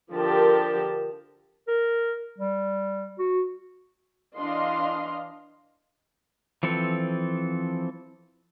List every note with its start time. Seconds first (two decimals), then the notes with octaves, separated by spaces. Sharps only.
0.12 D3 F3 G4 A#4 A5
1.68 A#4
2.38 G3
3.19 F#4
4.37 E3 D4 D#5 F5 C6
6.63 E3 F3 C4 A4